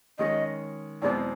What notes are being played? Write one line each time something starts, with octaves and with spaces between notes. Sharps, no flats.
D#3 G#3 C#4 D#5
E2 B2 G#3 C4 D5